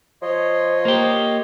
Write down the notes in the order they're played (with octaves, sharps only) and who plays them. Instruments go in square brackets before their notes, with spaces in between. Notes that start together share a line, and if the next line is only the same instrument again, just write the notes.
[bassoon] F3 [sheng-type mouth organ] C#5 D#5 C6
[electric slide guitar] A#3 G4